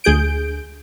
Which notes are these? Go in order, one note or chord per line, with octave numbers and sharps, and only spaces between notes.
D2 G#4 G6 D7